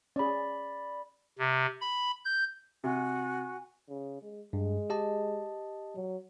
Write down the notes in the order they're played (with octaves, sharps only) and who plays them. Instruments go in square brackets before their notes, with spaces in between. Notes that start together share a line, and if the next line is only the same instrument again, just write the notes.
[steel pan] C#4 G#4 [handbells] D5 B5
[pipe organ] C3
B5
G6
[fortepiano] C3 [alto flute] F#4 [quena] G#5
[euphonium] C#3
G#3
[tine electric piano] G2 [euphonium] G#3
[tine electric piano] G4 D#5 A5
[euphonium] F#3